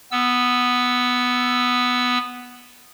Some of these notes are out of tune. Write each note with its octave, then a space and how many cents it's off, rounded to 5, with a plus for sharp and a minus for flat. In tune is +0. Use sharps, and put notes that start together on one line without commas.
B3 +0 E6 +0